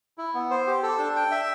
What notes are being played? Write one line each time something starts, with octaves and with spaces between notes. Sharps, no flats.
E4
B3
C5
G4
A4
D4
G5
E5